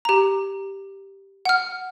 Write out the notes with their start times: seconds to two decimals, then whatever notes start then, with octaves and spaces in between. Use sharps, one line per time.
0.05 G4 A#5
1.45 F#5 F6